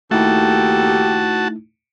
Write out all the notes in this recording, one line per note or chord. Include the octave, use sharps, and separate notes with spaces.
D#2 A3 D#4 E4 F#4 G4 A4 A5